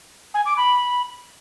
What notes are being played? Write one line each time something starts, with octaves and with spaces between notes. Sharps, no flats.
G#5
D6
B5